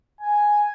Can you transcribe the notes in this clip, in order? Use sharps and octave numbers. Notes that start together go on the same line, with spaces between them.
G#5